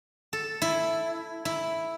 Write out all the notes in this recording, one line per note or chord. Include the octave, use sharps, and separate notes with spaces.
A4
E4
E4